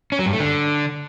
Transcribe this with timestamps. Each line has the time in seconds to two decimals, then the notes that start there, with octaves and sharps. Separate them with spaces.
0.12 C#4
0.19 F#3
0.26 G2
0.33 A3
0.40 D3